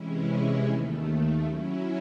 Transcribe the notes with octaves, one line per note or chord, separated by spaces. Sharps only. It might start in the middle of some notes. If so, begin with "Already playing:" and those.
Already playing: C3 E3 G#3 C#4 E4
D#2 D#3 A3
F#3 C#4 E4